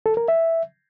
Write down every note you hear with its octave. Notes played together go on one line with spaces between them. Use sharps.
A4
A#4
E5